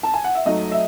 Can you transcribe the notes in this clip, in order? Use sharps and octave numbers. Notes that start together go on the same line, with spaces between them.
A5
G#5
F#5
E5
G#2 F#3 A3 D#4 D#5
E5